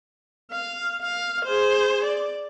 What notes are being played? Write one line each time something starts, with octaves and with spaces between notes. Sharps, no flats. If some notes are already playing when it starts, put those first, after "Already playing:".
F5
F5
G#4 C5
D5